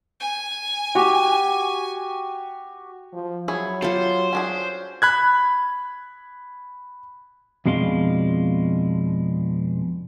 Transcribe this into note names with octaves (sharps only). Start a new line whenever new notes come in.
G#5
F#4 G4
F3
F#3 E4 G#4 C#5
F4 G4 A4 C5
C#4 D4 G#4
B5 F#6 G#6
F2 B2 G#3 D4 F4